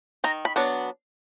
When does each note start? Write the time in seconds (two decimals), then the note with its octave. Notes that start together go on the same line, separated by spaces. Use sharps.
0.24 D#3 A#5
0.45 B5
0.56 F#3 B3 D4